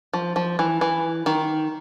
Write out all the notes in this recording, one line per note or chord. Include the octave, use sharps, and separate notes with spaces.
F3
F3
E3
E3
D#3